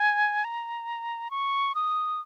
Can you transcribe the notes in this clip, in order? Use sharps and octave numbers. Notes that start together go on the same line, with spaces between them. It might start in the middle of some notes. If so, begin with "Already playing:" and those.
Already playing: G#5
A#5
C#6
D#6